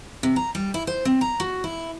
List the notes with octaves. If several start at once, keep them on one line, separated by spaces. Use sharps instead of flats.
C3
A#5
G3
E4
C5
C4
A#5
F#4
E4